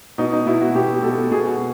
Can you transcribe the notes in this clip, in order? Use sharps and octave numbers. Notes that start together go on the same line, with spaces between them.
B2 D#4
D#4
B2 E4
F#4
B2 G4
B2 A4
B2 G#4
F#4